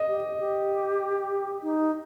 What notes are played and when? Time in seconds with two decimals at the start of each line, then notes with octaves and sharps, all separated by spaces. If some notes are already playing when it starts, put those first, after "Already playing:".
Already playing: D#5
0.08 G4
0.39 G4
1.63 D#4